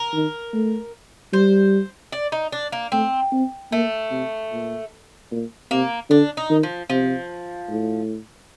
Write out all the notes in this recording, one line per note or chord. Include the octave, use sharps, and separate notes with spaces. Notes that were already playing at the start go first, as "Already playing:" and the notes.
Already playing: A#4
D#3
A3
G3 C5
D5
D#4
D4
A#3
A3 C4
C4
A3 A#3
C3
A#2
A#2
C3 A#3
D3 D4
D#4
D#3
F3
C3 F3
A2